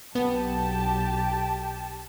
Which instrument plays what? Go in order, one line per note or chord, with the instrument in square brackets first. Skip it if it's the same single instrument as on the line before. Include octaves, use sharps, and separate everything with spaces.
[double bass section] B1 [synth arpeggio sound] B3 [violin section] G4 A5